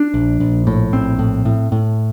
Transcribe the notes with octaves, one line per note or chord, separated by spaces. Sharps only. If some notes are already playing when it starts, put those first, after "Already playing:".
Already playing: D4
A#1
A#1
A2
A#1 C4
A2
A2
A2